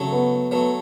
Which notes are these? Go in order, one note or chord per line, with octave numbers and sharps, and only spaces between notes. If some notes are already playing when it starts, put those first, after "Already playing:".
Already playing: C#3 F#3 A3
B3
B3
F#3 A3 B3